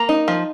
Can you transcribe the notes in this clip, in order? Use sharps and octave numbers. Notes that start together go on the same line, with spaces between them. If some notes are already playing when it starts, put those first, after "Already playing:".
Already playing: A#3 A#5
D#4
F3